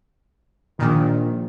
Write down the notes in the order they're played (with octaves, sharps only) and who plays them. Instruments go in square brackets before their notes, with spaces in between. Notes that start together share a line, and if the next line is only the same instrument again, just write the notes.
[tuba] A#1 [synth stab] A#2 D#3